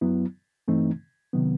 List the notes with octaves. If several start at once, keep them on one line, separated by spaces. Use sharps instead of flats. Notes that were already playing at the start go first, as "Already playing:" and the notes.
F#2 F#3 B3 E4
G2 E3 A3 C4 D#4
C3 D#3 F#3 B3